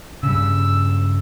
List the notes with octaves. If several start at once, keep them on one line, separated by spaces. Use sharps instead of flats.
G2 C#3 E6